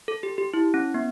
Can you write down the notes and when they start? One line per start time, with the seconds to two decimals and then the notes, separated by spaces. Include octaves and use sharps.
0.08 A4
0.23 G4
0.38 G4
0.54 E4
0.74 C#4
0.94 B3